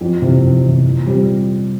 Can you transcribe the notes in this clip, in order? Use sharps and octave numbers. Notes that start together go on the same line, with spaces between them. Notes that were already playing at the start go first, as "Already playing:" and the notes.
F2
C3 E3
F2
C3 E3
A#2
G3 C4